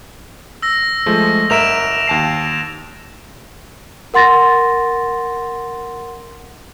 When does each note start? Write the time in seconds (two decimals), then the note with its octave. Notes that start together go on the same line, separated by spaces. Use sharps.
0.63 E6 A#6
1.06 F3 G#3 A3
1.50 G1 A#4 E5 D7 E7 F7
2.08 D#2 A5 C7
4.14 A#4 F#5 C6 A6 A#6